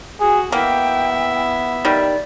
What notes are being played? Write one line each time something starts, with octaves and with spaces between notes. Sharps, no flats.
F#4 G#4
A#3 B3 E4 E5 G5
D#3 G3 D5